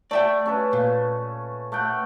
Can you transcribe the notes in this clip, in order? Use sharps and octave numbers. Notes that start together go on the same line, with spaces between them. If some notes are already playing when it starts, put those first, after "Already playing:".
A3 D5 E5 G5
C#4 A4 B4
A#2
A3 F#5 G5